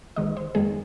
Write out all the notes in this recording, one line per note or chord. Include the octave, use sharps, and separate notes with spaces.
A#1 G#2 D#3 G#3 D#5
C5
F#2 D#3 G#3 G#4